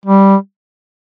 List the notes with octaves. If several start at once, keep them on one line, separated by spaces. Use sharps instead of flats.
G3